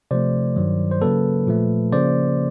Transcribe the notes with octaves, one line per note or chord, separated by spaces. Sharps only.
C3 F3 A3 C5 D5
G2 D#3 F#3
C5
C#3 F#3 A#3 A4 B4
A#2 F3 A3
C#3 F3 A#3 C5 D5